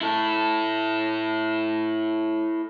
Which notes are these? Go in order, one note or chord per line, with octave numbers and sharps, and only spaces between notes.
E4 A4